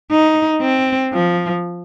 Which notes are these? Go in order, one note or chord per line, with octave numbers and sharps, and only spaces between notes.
D#4
C4
F3